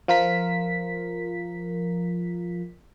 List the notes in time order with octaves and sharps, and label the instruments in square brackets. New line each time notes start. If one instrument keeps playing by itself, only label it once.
[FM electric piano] F3 F4 A#4 B6